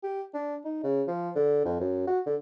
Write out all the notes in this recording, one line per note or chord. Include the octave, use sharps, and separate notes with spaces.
G4
D4
D#4
C#3
F3
D3
F2
F#2
F#4
D3